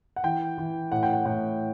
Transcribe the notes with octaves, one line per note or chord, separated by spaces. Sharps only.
F#5
E3 G5
E3
A2 F#5
G5
F#5
A2 F#5